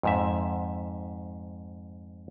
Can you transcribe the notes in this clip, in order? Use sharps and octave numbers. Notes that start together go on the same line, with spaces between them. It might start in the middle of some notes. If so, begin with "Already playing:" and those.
F2 G#2 E5